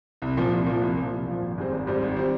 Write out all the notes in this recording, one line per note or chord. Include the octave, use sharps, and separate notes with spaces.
C2
A#2 F3
C2
A#2 F3
C2
A#2 F3
C2
A#2 F3
G#1
G#2 G3 C4
G#1
G#2 G3 C4
G#1
G3 C4